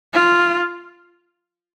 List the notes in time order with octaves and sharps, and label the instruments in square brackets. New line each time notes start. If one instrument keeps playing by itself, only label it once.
[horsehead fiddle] F4